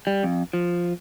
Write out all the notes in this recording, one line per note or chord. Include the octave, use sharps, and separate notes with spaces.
G3
F2
F3